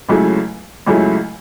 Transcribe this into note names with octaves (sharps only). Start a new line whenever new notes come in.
C#2 C#3 F#3 A3 E4
C#2 C#3 F#3 A3 E4